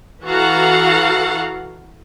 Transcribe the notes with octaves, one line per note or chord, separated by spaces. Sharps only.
E3 F#4 A4 F5 F#5 A#5